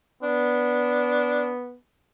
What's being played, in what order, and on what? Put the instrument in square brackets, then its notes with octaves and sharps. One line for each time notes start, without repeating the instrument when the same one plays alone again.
[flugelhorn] B3 [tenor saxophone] D4